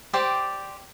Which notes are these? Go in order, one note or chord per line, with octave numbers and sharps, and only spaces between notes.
G4 C5 D5 G5